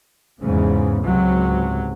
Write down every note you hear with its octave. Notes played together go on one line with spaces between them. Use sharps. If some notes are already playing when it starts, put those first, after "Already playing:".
E2 G#2 C#3
C#2 G#2 C3 F#3